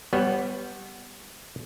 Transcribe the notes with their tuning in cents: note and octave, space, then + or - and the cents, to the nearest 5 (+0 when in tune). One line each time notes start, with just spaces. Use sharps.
G3 +0 B3 +0 C#5 -30